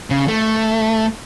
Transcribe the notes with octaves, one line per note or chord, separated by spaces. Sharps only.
C#3
A3